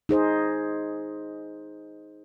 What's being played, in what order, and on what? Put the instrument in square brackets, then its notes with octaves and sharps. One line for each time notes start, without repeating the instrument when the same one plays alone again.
[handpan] D#4 G#4 C5 D#5